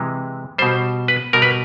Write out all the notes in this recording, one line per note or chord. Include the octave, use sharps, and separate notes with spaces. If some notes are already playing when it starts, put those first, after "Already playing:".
Already playing: C3 E3 G#3
B2 G3 C5
B4
B2 G3 A#4
B4